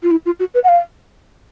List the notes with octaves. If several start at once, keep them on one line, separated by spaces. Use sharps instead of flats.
F4
E4
F4
F#4
B4
F#5
F5